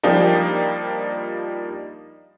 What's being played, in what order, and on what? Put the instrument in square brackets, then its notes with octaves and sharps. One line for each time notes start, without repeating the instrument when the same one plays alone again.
[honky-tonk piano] F3 G3 A#3 D4 D#4